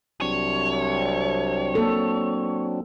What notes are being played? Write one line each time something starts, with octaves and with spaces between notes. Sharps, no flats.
C2 F#3 C4 D4 C#5
A#3 A4